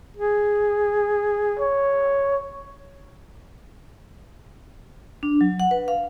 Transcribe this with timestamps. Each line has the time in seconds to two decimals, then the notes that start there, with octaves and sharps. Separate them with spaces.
0.17 G#4
1.60 C#5
5.23 D4
5.41 F#3
5.60 F#5
5.71 B4
5.88 F5